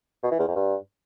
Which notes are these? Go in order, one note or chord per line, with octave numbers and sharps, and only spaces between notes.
B2
E3
E2
F2
G2